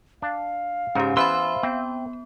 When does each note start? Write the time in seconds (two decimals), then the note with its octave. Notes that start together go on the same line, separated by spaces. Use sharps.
0.22 D4 F5
0.95 G#2 C#3 C#4 D#4 G4
1.17 E3 B3 C5 E5 B5 C6 E6
1.63 B3 C4